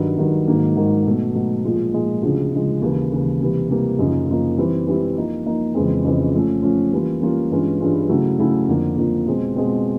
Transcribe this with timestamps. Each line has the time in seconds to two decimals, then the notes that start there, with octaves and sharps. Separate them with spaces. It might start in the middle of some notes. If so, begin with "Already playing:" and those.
Already playing: G2 D#3 F#3
0.18 G2 D#3 F#3
0.47 G#2 D#3 F#3 A#3
0.77 G#2 D#3 F#3 A#3
1.06 B2 F#3 A3
1.35 B2 F#3 A3
1.64 A#2 F3 G#3
1.93 A#2 F3 G#3
2.22 D2 C#3 F3 G#3
2.52 D2 C#3 F3 G#3
2.82 D#2 C#3 E3
3.12 D#2 C#3 E3
3.41 C3 E3 G3 A#3
3.69 C3 E3 G3 A#3
3.99 F#2 C#3 F3 A#3 D#4
4.28 F#2 C#3 F3 A#3 D#4
4.58 E3 G3 C4 E4
4.87 E3 G3 C4 E4
5.16 F3 A#3 D#4
5.45 F3 A#3 D#4
5.74 F2 C#3 E3 G#3 C4
6.05 F2 C#3 E3 G#3 C4
6.34 F3 A3 C#4
6.62 F3 A3 C#4
6.92 E3 G3 A#3 C#4 F4
7.22 E3 G3 A#3 C#4 F4
7.51 G2 E3 G#3 C#4 F4
7.80 G2 E3 G#3 C#4 F4
8.09 C#3 F#3 A3 C#4 E4
8.39 C#3 F#3 A3 C#4 E4
8.69 F2 D3 F3 A#3
8.97 F2 D3 F3 A#3
9.27 B2 G#3 C4
9.56 B2 G#3 C4